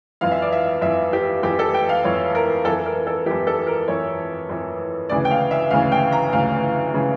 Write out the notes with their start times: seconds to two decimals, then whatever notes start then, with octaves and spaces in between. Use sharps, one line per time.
0.21 F2 E3 F5
0.32 E5
0.42 D5
0.52 E5
0.82 F2 E3 E5
1.13 G4
1.43 F2 E3 G4
1.59 A4
1.74 G5
1.89 F5
2.04 F2 E3 C#5
2.35 A#4
2.65 F2 E3 A4
2.86 A#4
3.07 A4
3.26 E3 G4
3.31 F2
3.47 A4
3.67 A#4
3.88 F2 E3 C#5
4.49 F2 E3
5.09 D2 C#3 E3 D5
5.25 G5
5.31 F5
5.51 E5
5.70 D2 C#3 E3 F5
5.92 G5
6.12 A#5
6.33 D2 C#3 E3 F5
6.94 C#3 E3